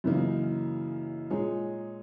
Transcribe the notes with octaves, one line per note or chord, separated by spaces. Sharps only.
F#2 C#3 E3 A#3 D#4
A#2 G#3 D#4 G#4 C#5